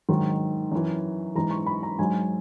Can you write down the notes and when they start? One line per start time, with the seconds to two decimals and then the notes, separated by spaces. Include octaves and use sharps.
0.09 G#2 D#3 F#3
0.72 F#2 E3
1.35 G#2 E3 A#5
1.51 C#6
1.66 B5
1.83 A#5
1.99 G#2 F#3 G#5